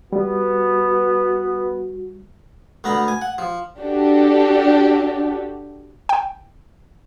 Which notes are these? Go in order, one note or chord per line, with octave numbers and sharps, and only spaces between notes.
G3 B3 F#4
D2 B3 A#5 B5
G#5
F#5
F3
D4 F#4 G4 A4
G5